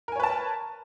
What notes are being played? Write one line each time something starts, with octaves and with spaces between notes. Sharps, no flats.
A#4 B4 C#5 G#5 A5